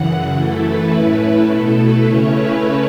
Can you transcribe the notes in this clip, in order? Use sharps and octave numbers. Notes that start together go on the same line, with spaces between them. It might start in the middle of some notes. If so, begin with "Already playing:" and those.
Already playing: F#2 C#3 E3 F#5
F#2 E3 A3 E4 A4
B4
A2 A3 C#4 E4 B4
B2 A3 E4 A4
B4
C#3 A3 C#4 E4 C#5
B4